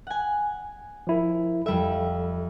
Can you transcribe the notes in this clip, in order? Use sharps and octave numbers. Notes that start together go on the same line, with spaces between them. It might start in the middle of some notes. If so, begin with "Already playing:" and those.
F#5 G#5
F3 E4 A#4
F2 G3 A4 E5